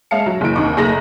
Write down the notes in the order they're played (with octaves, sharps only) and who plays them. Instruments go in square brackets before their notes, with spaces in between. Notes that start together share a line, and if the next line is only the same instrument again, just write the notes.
[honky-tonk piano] G#3 C#5 E5 F5 A5 C#7
F#3
F#1 E3 D7
D#2 C3 D#4 C#6 D6
F#1 A3 G#4 A#5 A#6 F#7